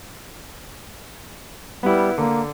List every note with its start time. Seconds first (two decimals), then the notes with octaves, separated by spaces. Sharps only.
1.83 G3 B3 E4
2.18 D3 A#3